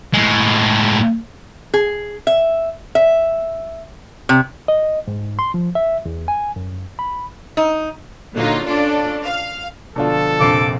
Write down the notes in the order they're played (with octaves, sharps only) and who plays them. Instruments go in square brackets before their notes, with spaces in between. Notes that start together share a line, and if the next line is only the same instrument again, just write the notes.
[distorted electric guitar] A2 G#3
[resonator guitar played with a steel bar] G#4
E5
E5
C3
[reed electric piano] D#5
G#2
C6
F3
E5
E2
G#5
F#2
B5
[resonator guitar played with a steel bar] D#4
[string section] A#2 D3 F#3 D#4 F4
C#4 D4 F4 A4 D5
F5
[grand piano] B2 D4 F4 [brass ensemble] D3 F3 A4
[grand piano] F1 A#1 C7 [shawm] D6